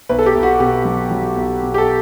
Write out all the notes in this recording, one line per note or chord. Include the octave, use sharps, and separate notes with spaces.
B1 B4
A4
G4
B1
F#4
B2 G4
F#3
F#3
B1
B2
G4
A4